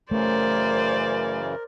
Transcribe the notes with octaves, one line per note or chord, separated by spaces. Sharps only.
F#2 C#3 E3 A3 A#4 C5 D5